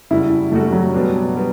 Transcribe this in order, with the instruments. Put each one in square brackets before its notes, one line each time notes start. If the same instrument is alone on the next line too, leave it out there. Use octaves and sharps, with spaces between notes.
[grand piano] F#2 C#3 G3 D4 F#4 [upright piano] E4
[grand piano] F#2 C#3 G3 D4 F#4 [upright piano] A3
[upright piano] F#3
[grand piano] B2 G3 B3 D4 F#4
B2 G3 B3